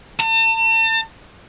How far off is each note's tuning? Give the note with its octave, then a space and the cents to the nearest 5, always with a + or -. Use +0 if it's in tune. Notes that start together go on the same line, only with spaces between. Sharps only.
A5 +40